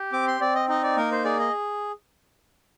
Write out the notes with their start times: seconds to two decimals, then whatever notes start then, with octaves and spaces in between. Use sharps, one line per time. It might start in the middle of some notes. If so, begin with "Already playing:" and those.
Already playing: G4
0.13 C4 D6
0.27 C6
0.41 C4 D5
0.55 D#5
0.68 D#4 D#5
0.83 D5
0.97 A#3 A#4
1.11 C5
1.25 G#4 D5
1.40 D#5